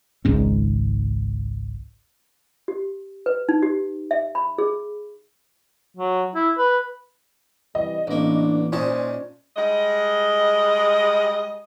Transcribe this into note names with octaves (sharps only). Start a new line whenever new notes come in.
G#1 C#2 G#2 C#4
G4
B4
D#4
G4
E5
B5
G#4
F#3
E4
B4
C3 E3 G3 D#5
A1 A#3 B3 D4
A#2 C#4 D#4 C5 A5
G3 G#3 D#5